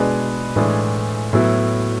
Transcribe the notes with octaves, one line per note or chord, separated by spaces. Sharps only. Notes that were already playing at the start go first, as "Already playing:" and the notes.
Already playing: B2 G#3 D4 G#4 B4
A2 E3 G#3 D4 G#4
A2 F#3 B3 E4